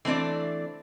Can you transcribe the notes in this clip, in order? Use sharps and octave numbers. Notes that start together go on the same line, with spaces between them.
E3 A3 C4 D4 D5